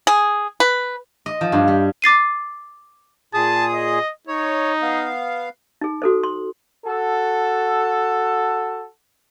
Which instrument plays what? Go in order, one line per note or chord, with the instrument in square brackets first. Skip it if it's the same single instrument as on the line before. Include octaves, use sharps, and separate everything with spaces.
[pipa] G#4
B4
[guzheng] D#5
F3
G2
G3
[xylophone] D6 A6 C7 D#7
[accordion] A#2 G#4 D#6 [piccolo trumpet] A5
[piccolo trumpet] D#5
[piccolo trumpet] D#4 [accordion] C#5
[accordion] B3 F5
[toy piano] D#4 G#4
F#4 A4 C5
C6
[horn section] F#4 A4